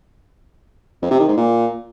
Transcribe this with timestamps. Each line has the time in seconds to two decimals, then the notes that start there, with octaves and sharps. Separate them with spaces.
1.02 F2
1.11 C3
1.20 D#3
1.28 G#2
1.37 A#2